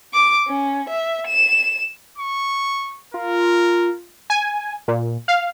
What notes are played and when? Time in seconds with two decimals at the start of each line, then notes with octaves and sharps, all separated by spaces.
0.14 D6
0.48 C#4
0.89 E5
1.27 E7
2.18 C#6
3.14 F4 A#4
4.30 G#5
4.88 A#2
5.28 F5